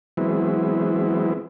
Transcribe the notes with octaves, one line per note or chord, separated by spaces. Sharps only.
E3 F#3 G#3 B3 C4 E4